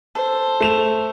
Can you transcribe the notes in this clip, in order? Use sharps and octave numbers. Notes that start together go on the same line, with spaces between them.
A4 C5
A3 E7 F7